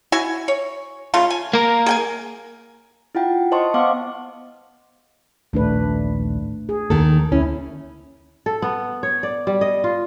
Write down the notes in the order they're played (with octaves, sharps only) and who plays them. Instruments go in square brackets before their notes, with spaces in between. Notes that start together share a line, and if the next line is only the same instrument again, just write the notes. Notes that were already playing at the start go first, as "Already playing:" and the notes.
[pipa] E4 F#4 G#5
C#5
C#3 A3 F4
G#5
[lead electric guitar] A#3 A#4
[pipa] G#4 G5 G#5
[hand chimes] E4 F4 F#5 G5
C5 D#5 A5 C6 C#6
B3 C5 F5 F#5 D6
[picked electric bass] A#1 D#2 A2 [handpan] A3 D4 B4
[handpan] G#4
[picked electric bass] D#2 A#3 [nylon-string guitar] D#3 A4
[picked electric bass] D2 [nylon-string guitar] C#4 [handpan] E4
[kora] A4
B3
C#5
D5
G3
D#5
F4